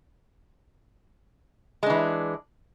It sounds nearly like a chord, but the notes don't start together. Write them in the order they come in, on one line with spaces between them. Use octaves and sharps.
G#3 D4 E3